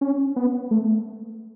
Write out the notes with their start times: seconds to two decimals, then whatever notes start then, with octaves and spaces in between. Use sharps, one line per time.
0.01 C#4
0.36 B3
0.71 A3